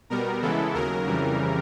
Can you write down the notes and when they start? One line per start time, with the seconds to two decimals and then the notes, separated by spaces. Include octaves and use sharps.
0.10 B2 G3 B3 A#4
0.42 C#3 E3 G#3 B3 E4 A4
0.74 D#2 C#3 F#3 A#4
1.07 F2 C#3 E3 G3